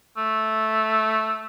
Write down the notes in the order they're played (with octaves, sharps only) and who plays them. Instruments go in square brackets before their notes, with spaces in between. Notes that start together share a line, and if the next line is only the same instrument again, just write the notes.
[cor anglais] A3